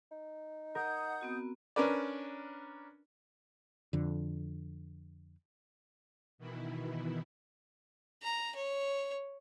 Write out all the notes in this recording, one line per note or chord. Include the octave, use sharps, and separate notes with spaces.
D#4
A#4 F#5 D#6 G6
B3 C4 F#4
C#4 D4 A#4 B4 D5
F2 D3
B2 D#3 E3 E4
A#5
C#5